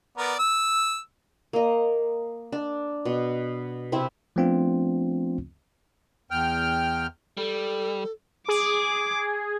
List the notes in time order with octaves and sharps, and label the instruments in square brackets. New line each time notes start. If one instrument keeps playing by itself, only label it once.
[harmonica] B3 A#4 D5
E6
[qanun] A#3 D#5
D4
B2
C3 C4 E4
[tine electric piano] F3 A3 B3 C4 D4 F4
[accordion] E2 G5 F6
[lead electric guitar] G3 [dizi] A4
[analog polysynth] G#4 [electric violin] D6